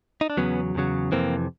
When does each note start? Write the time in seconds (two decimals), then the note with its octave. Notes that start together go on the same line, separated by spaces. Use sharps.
0.21 D#4
0.30 D4
0.37 E2 C#3 F#3 B3 C#4
0.75 E2 C#3 F#3
1.12 F2 C3 E3 A#3 C4